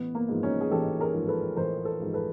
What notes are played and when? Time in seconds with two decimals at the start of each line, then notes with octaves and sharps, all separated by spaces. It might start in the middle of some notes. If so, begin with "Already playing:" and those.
Already playing: A1 B3
0.15 A#3
0.29 G#2 F3
0.43 C#4 D#4
0.61 G#4
0.71 A1 G4 A4
1.00 G#4 A#4
1.14 G#2 F3
1.28 A4 B4
1.57 A1 A#4 C5
1.85 A4 B4
2.00 G#2 F3
2.14 A4 B4